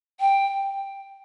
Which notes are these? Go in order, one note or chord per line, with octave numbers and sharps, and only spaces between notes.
G5